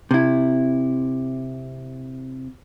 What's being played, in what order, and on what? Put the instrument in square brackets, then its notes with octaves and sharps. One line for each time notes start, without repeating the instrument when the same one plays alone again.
[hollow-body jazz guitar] C3 E4